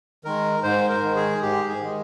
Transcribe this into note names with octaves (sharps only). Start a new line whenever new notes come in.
D#3 G#3 A#4
G#2 C5
A#4
D#3 G#3
G#4
G#2 G4
G#4
D#3 G#3